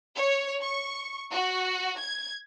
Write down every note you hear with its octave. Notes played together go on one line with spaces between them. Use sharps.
C#5
C#6
F#4
G#6